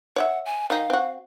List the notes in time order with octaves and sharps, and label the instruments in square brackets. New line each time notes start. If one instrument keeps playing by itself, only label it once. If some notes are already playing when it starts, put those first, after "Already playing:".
[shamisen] C#5 D5 E5 [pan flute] F#5
[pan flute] G#5
[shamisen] D#3 D#4 [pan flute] F5
[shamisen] C4 F#4